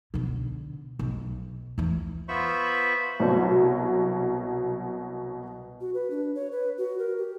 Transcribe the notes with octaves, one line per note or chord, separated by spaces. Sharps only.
B2 D3
B1
E2 E3
B3 F4 C5 E5 B5 C#6
C2 B2 F#3
F#4
B4
D4
C#5
B4
F#4
A#4
G4